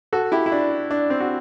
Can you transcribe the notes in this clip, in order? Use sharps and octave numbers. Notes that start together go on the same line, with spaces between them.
F#4 A4
E4 G4
E4
D4
D4
C4
F#4